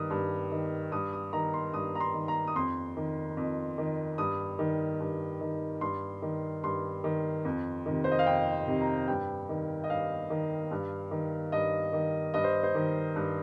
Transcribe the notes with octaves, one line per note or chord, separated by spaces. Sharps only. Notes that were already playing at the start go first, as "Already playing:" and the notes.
Already playing: G2 D#3 D#6
G2
D#3
G2 D#6
D#6
D#3 A#5
C6
G2 D#6
A#5
C6
D#3
A#5
D#6
F2 C6
D#3
F2
D#3
G2 D#6
D#3
G2
D#3
G2 C6
D#3
G2 C6
D#3
F2
C3 D#3
C5
D#5
F5
F2 G5
C3 D#3
A#5
G2 G5
D#3
D#5
G2 F5
D#3
G2
D#3
G2 D#5
D#3
G2 D#5
C5
C5
D#3
G2